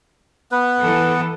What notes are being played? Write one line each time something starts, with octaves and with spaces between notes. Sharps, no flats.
B3 B4
E3 A4